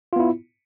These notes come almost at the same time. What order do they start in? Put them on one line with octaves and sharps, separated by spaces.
F4 B3 E4